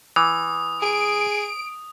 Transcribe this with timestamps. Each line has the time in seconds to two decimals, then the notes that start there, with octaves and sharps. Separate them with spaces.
0.16 E3 D#6
0.82 G#4 D7